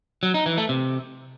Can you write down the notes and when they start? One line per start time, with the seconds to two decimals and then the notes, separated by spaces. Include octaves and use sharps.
0.23 F#3
0.34 D#4
0.46 E3
0.58 A3
0.69 C3